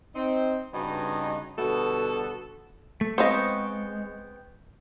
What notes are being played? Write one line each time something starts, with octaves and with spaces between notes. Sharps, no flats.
C4 D#4
G2 C#3 B3 D#4 F#4 D#5
B2 D3 G3 B3 F#4 A4
A3
G#3 B3 C4 C5 D#5 F5 G5 C#6